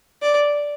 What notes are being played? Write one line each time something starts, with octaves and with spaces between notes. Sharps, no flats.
D5